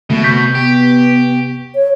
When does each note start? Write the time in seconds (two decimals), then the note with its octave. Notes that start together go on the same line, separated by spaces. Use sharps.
0.10 B2 D3 A3
0.24 C3 C#6 G6 B6
0.55 B3 G4
1.75 C#5